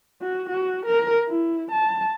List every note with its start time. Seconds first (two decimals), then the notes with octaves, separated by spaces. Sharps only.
0.21 F#4
0.50 F#4
0.86 A#4
1.27 E4
1.72 A5